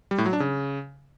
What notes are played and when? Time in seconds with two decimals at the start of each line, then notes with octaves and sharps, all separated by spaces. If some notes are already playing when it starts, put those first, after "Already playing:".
0.11 G3
0.18 A2
0.26 F#3
0.33 D4
0.40 C#3